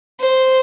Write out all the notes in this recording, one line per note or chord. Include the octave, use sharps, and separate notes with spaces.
C5